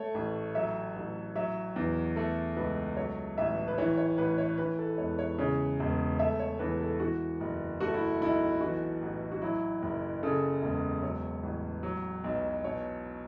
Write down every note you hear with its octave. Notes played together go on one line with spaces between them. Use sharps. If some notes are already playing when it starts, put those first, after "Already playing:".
Already playing: A3 C#5
A1
F#3 E5
A1
F#3 E5
E2
A3 A4
C#2 B4
F#3 C#5
A1 E5
B4
E3 C#5
C#5
A1 B4
C#5
E3 B4
A4
E1 C#5
C#5
C#3 C#5
E1
A3 E5
C#5
E2 B4
A4
E3 F#4
F#1
A3 F#4
E4
B1 E4
E3 F#4
A1
F#4
F#3 E4
F#1
C#3 A4
E1
F#3 C#5
A1
F#3
B1
B2 C#5